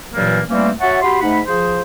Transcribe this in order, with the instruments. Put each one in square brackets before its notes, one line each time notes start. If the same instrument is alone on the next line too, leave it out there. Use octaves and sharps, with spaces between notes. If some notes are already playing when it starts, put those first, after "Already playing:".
[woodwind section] G2 A#2 E3 F#3 G3 A#3
E3 G3 A3 A#3 C4 C#4
F#4 C#5 E5 F#5 A5 C#6
F#4 G4 B5 C6
G#2 A3 D#4 F#5 B5
F3 G#4 C5